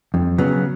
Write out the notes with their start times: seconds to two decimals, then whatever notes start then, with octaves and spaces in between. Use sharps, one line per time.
0.14 F2
0.38 C#3 F#3 B3